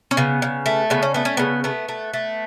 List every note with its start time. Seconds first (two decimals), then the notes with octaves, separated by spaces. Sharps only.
0.11 C#4
0.17 C#3 B3
0.42 C#3
0.66 A3
0.90 C#3 B3
1.02 C#4
1.14 A3 B3
1.25 C#4
1.37 C#3 B3
1.64 A3 B3
1.89 A3
2.13 A3